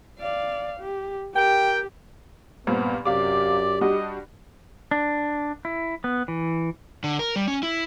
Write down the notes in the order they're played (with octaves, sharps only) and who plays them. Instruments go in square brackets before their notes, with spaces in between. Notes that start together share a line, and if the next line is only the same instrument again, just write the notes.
[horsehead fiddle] D5 F5
G4
[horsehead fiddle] G4 [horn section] A#4 G5
[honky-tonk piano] G2 A#2 C4 [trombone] B3
[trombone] F#2 [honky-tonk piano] C3 F5 D6 [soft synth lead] G4 [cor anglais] D5
[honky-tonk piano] G3 D4 F#4 [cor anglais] D#5
[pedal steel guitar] D4
E4
B3
E3
[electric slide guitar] D3
A#4
G3
C#4
E4